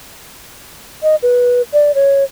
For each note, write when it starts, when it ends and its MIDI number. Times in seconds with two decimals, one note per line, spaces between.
1.03 1.16 75
1.23 1.62 71
1.73 1.92 74
1.95 2.24 73